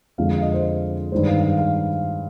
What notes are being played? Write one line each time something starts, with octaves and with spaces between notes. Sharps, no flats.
F2 D3 G#3 F5
F5
D#5
C5
G2 D#3 G#3 C5
F5
F5
F5